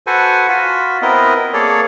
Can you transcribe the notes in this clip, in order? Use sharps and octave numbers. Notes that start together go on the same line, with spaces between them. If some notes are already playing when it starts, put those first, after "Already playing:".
F#4 A4 B4 C5 F#5 G#5
F4 F#4 B5
B3 C4 E4 A#4 D#5
A#3 G#4 A4 C#5 D5